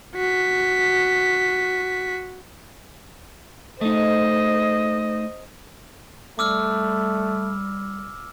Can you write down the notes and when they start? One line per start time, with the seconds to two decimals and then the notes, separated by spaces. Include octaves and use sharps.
0.16 F#4 B6
3.81 A3 D#4 C5 D#5
6.39 G3 A3 D6 E6 F6